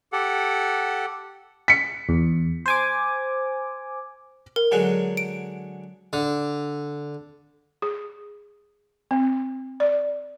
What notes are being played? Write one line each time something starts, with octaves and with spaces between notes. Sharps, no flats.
G4 A4 F#5
B6 C#7
E2
C5 G#5 D6
A#4
D3 F#3 G#3
D7
D3
G#4
C4
D5